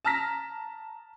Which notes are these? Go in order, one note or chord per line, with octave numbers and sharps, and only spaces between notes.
A5 A#5 F6 A#6 B6